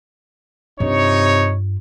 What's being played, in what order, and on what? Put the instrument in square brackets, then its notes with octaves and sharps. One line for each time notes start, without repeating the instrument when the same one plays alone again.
[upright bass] G2 F4 [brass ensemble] C3 D#4 C#5